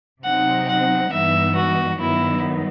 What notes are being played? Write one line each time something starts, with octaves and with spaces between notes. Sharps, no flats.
C3 F#3 C4 D#4 F#5
F#5
G2 E3 G3 B3 D#4 E5
F#4
G2 D#3 F#3 B3 D#4 E4